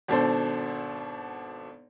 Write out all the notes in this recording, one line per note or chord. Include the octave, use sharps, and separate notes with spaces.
G#1 B2 D4 A4 C5